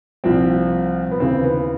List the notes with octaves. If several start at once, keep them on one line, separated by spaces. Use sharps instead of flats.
C2 A#2 F3 C4
B3
D#2 C#3 E3 C4
B3